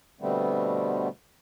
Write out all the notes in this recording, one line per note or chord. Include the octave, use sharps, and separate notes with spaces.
B2 D3 G3 A3 B3 C4